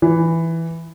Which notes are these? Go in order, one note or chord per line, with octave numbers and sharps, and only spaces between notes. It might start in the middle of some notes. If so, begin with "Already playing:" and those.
E3